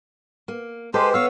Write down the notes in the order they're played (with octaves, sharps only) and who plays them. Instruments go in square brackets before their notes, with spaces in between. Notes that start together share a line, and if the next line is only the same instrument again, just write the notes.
[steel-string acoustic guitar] A#3
[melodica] G#3 G4 C5 [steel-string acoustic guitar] A4 B4
[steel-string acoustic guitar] B3 C#5 [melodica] F5 E6